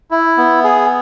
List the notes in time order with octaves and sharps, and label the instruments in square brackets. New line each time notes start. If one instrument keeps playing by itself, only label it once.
[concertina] E4
B3
G#4